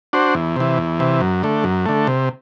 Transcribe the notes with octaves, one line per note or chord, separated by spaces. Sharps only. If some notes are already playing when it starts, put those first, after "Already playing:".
D4 F#4 C5
E2
C3 E3
E2
C3 E3
F#2
D3 A3
F#2
D3 A3
C3